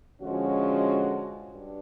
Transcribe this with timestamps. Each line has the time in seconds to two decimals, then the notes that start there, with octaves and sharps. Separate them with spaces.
0.20 D3 F3 G#3 C#4 F#4
1.50 G2